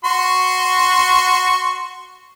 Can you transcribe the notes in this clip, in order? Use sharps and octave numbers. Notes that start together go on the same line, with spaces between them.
F#4 C6 C#6